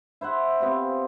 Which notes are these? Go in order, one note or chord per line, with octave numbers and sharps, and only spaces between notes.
E4 C5 E5 F#5
B3 C4 F4 G4